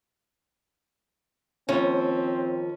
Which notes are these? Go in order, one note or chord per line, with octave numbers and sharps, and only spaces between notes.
D#2 F3 C4 C#4